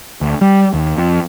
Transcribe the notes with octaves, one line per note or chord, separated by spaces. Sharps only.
D2
G3
D#2
F2